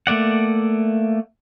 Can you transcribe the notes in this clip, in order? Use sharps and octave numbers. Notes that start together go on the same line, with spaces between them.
A3 A#3 D5 F#5